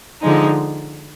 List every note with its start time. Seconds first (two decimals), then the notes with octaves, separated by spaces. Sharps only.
0.22 D3 F3 G#3 D#4